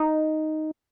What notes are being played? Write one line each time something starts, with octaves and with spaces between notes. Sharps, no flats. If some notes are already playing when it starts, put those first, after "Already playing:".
Already playing: D#4